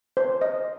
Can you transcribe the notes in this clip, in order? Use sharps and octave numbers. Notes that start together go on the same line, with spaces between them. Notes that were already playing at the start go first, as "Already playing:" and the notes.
C5
D#5